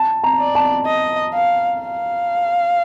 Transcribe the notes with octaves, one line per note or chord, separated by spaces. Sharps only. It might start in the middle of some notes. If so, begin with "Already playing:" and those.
Already playing: A5
A#5
D5
A5
D#5
F5
F5